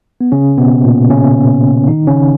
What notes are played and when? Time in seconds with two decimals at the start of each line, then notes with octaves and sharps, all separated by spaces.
0.21 B3
0.32 C#3 C#4
0.58 B2 B3
0.84 A#2 A#3
1.10 C#3 C#4
1.87 D#3 D#4
2.07 C#3 C#4